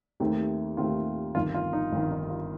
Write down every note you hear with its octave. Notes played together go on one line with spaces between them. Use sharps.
D#2 D#3 A3 C4 D#4 G4
D#2 D#3 A3 C4 F4 G4
G1 F2 D#3 F4
F4
D#4
G1 F2 D#3
D#4
F4